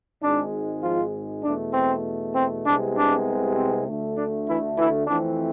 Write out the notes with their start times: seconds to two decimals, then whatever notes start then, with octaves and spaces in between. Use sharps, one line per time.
0.23 G#1 G#2 G#3 D4
0.83 F3 F4
1.44 E2 B2 A3 D4
1.74 C4
2.35 C4
2.65 C2 C3 G#3 B3 D4
2.96 D4
3.56 C4
3.86 D2 D3 A3
4.16 D4
4.47 E3 E4
4.77 E3 E4
5.07 F2 E3 A3 C4 D4